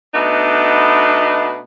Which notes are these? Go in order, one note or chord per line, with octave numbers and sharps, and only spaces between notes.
B2 A3 B3 D4 D#4